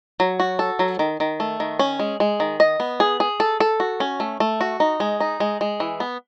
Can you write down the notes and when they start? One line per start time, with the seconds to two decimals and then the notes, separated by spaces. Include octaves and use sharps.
0.20 F#3
0.40 F#4
0.59 A4
0.79 F#3
0.99 D#3
1.20 D#3
1.40 A3
1.60 D#3
1.79 C#4
1.99 G#3
2.20 G#3
2.40 D#3
2.60 D#5
2.80 B3
3.00 G#4
3.20 G#4
3.40 A4
3.60 A4
3.80 F#4
4.00 C#4
4.20 A3
4.40 A3
4.61 F#4
4.80 D#4
5.00 G#3
5.20 D#4
5.40 G#3
5.61 G#3
5.80 E3
6.00 B3